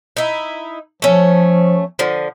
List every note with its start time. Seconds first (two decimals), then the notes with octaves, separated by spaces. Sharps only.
0.17 D#4 E4
1.02 F3 A3 C#4
1.99 D3 F3